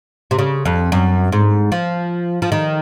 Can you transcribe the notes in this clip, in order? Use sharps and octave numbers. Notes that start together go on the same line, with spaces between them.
C3
C#3
F2
F#2
G#2
F3
F3
D#3